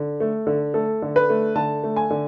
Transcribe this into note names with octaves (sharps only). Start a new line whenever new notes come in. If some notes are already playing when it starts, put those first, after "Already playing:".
Already playing: D3
A3
D3
A3 A4
D3
B4
A3
D3 A5
A3
G#5
D3